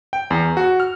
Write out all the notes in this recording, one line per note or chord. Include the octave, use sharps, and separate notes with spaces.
G5
E2
F#4
F6